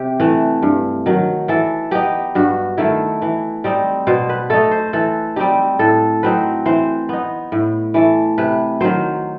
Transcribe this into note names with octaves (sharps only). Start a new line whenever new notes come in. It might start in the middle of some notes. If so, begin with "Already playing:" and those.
Already playing: C3 G4
E3 A3
G2
D#3 F#3
E3 A4
B3 D#4 G4
G2 F#4
D#3 A3 E4
E3
G3 C4 D#4
B2 C5
B4
A3 D#4 A4
C5
E3 A4
G3 C4 D#4 G4
A2 A4
F#3 C4 D#4 B4
E3 C5
B3 D#4
A2
E3 A3
C3 B4
D#3 F#3 C5